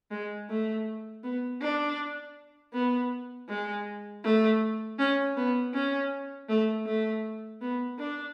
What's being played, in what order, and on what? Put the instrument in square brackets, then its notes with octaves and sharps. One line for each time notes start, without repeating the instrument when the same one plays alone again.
[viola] G#3
A3
B3
D4
B3
G#3
A3
C#4
B3
C#4
A3
A3
B3
D4